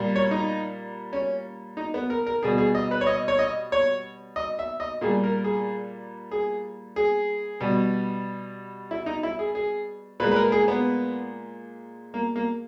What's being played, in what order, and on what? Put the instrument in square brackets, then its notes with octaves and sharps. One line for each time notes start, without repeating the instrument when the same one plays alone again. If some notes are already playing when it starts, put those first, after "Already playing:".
Already playing: [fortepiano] A#2 G3
C#5
D#4
C#4
D#4
B3
A#4
A#4
B2 G3 G#4
G#4
D#5
B4
C#5
D#5
C#5
D#5
C#5
D#5
E5
D#5
A#2 G3 G#4
A#4
G#4
G#4
G#4
B2 G3
E4
D#4
E4
G#4
G#4
A#2 B4
G#3
B4
A#4
G#4
B3
A#3
A#3